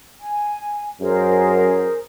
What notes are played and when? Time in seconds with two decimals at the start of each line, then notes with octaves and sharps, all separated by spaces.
0.21 G#5
1.00 F#2 G#4 A#4 C5